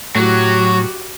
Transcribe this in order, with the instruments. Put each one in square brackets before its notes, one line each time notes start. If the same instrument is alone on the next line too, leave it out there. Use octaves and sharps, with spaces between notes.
[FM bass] A2 [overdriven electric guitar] F#3 [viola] F#4 G4